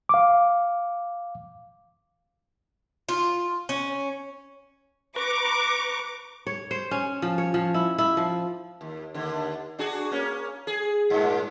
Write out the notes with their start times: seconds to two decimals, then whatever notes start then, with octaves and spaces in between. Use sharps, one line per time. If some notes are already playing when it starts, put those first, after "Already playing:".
0.09 F5 D6
3.09 F4
3.69 C#4
5.16 B4 A#5 C#6 D6
6.47 C#5
6.71 C5
6.91 C#4
7.22 F3
7.38 C#5
7.54 F3
7.74 E4
7.98 E4
8.17 F3
8.81 D#2
9.14 D#2 D3
9.79 D4 F#4 G#4
10.12 A#3 C#4
10.67 G#4
11.10 G2 A#2